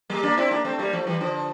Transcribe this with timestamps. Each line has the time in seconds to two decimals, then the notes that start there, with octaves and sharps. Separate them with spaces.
0.10 G3 A#3
0.23 A#3 D4
0.37 C4 E4
0.51 A#3 D4
0.65 A3 C4
0.79 G3 A#3
0.93 F3 A3
1.07 E3 G3
1.21 D3 F3